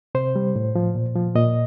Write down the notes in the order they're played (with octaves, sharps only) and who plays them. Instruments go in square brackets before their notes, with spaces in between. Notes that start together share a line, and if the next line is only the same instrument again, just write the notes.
[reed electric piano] C3 C5
G3
A2
F3
A#2
F3
A#2 D#5